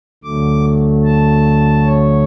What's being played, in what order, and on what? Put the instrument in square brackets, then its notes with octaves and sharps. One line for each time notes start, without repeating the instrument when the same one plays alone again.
[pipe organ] D2 D3 F#3 A3 D6
A5
C#5